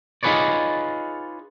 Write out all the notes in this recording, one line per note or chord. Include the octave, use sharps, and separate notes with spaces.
D#4 F4 G#4 B4 C#5 D5